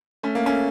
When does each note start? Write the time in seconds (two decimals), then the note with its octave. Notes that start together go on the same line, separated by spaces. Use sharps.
0.23 A3 C#4
0.35 A#3
0.46 A3 C#4